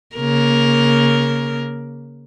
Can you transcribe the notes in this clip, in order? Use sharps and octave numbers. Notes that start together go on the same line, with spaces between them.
C#3 A#3 A#4